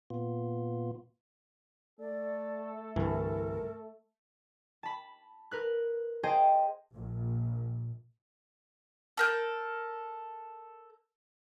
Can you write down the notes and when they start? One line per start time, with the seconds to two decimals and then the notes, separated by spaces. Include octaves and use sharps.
0.10 A#2 B3 F4
2.00 A3 A4 D5
2.96 C2 G2 D3 E3 A#4
4.83 A5 B5
5.51 A#4 B4 F#6
6.23 G#4 C5 D#5 G5 A5
6.94 A#1
9.17 A4 A#4 G6